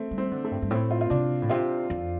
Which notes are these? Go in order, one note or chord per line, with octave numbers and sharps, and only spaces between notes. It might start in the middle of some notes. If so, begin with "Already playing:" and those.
Already playing: A3 C4
G3
C4
D3
A3
G2
G2
A2 C4
F4
F4
C3 D4
A2
C3 F4
F2